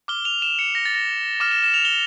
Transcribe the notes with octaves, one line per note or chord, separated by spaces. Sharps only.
D6 F6 G7
F7
E7
C#7
A#6
A6
A#6
D6 F6 E7
E7
E7
F7
G7